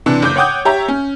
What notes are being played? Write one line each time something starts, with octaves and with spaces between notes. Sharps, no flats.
C3 E3 D4
F#1 D6 G6
C#5 F#5 G5 D6 D#6 G6
G4 C#5 E5 A#5
C#4